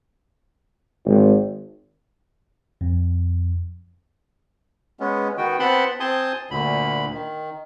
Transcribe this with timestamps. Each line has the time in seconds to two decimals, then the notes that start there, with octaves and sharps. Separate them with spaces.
1.05 G#1
2.81 F2
5.00 G#3 B3 C#4
5.38 D#3 B3 F#4 G5
5.59 B3 C4 F#5 A5 B5 C6
6.00 C4 G#5 A5 C6 D#6 G6
6.51 D2 A#2 D3 B5
7.13 D#3